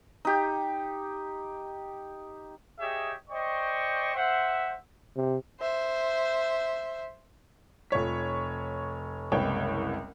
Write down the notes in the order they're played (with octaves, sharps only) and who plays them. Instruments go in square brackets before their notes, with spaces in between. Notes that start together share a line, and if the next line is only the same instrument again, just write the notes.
[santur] D#4 G4
[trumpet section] G4 G#4 C#5 D#5 E5 G5
C5 D5 D#5 G5 C#6
C5 E5 F#5
[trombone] C3
[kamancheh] C5 E5
[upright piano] F1 F4 C#5 B6
F#1 C2 G#3 B4 C#5 G5